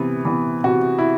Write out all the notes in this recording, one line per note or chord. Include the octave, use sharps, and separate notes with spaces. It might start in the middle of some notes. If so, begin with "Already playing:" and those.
Already playing: C3 E3 B3
E3 B3
C3 F#4
E4